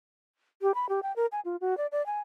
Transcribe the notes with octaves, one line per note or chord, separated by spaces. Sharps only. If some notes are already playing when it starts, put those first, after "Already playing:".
G4
B5
G4
G5
A#4
G#5
F4
F#4
D5
D5
G#5